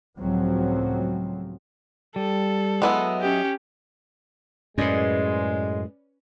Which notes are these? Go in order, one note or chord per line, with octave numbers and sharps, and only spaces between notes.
C#2 A2 F3 F#3 C4
G3 A4
F#3 G#3 B3 E4 D#5 E5
C#4 G4
F#2 A2 G#3 C#4 B4 D5